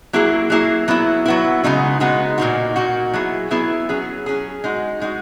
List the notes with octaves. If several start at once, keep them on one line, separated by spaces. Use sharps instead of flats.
F#3 A#3 E4 G#4
F#3 A#3 E4 G#4
F#3 B3 E4
F#3 B3 E4
C#3 G#3 B3 D#4 F#4
C#3 G#3 B3 D#4 F#4
A#2 A#3 D#4 F#4
A#2 A#3 D#4 F#4
F#3 B3 E4 G#4
F#3 B3 E4 G#4
F#3 C#4 G#4
F#3 C#4 G#4
G#3 D#4 F#4
G#3 D#4 F#4